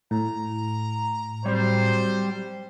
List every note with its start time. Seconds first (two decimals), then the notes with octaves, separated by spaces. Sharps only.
0.11 A2 A#5
1.46 F#3 G3 C4 C5